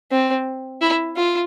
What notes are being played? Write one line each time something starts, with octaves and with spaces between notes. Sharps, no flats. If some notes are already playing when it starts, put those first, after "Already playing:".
C4
E4
F4